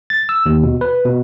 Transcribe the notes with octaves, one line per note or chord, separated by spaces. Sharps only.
A6
E6
D#2
B2
B4
B2